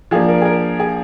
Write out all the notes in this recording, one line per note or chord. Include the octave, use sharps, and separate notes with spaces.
F3 A#3 D4 G#4
A#4
G#4
A#4
G#4